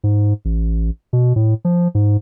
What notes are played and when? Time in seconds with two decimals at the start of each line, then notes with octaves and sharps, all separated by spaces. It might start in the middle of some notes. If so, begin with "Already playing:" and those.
0.04 G#2
0.45 A1
1.13 B2
1.36 A2
1.65 F3
1.95 G#2